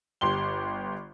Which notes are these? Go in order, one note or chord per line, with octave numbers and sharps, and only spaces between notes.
G1 G4 C6 G7